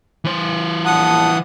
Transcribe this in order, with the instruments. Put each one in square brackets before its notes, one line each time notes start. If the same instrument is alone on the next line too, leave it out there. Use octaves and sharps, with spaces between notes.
[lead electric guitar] E3 C5
[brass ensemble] A#1 A#2 A5 [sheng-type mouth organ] F#5 D#6